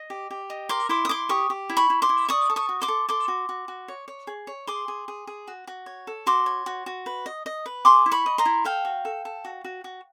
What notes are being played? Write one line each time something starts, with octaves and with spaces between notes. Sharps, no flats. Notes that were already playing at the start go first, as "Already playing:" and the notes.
Already playing: D#5
G4
G4
D#5
A#4 C6 D6
E4 C6 D6
D#6
E4 C6 D6
G4 C#6 D#6
G4
E4
B5 C#6
E4
C6 D6
E4
D5 C#6 D#6
A4
C#6 D#6
F#4
C6 D6
A4
A4 C6 D6
F#4
F#4
F#4
C#5
C#5
G#4
C#5
G#4 C6 D6
G#4
G#4
G#4
F#4
F#4
C#5
A4
F#4 C6 D6
C#5
F#4
F#4
B4
D#5
D#5
B4
G#4 C6 D6
E4
B5 C#6
D#5
A#5 C6
E4
A4 F5 G5
F#4
A4
A4
F#4
F#4
F#4